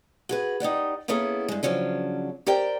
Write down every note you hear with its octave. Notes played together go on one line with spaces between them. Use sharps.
F#4 G#4 B4
D#4 G4 D5 F#5
A#3 B3 C#4 E4 G#4 A4
G2 G#3
C#3 F3 F#3 C#4 D4
G4 A#4 C5 D5 G5